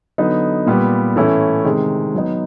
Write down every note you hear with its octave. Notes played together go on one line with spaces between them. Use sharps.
D3 F#3 B3 D#4
A#2 G3 B3
A2 E3 A3 C#4 E4
C3 D#3 G#3
F#3 B3 D#4